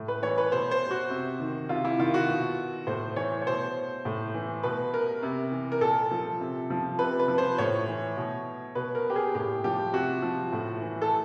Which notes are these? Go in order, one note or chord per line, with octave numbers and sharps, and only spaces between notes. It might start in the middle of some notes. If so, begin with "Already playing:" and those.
Already playing: A2
B4
E3 C#5
B4
B2 C5
C5
F#4
C3
D#3
C3 F4
E4
D#3 F4
F#4
B2
A2 C5
E3 C#5
C#5
B2 C5
A2
E3
B2 B4
A#4
C3
E3
A#4
A#2 A4
F3
C3
F3
C3 B4
B4
F3
C5
A2 C#5
E3
B2
B2 B4
A#4
G4
G#4
A2 G4
F3 G4
C3 F#4
F3
A2
E3
A4